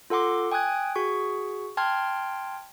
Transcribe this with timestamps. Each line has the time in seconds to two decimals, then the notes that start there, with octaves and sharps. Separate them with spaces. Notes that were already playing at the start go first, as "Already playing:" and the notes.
0.10 F4 A4 F#5 C6 D6
0.51 G5 G#5 D#6 F#6 G#6
0.96 F#4 G#4 C#6
1.77 G5 A5 C6 F6 G#6